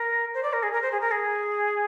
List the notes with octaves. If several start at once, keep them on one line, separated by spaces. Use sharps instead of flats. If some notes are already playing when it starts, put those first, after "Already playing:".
Already playing: A#4
C5
D5
A#4
G#4
A#4
C5
G#4
A#4
G#4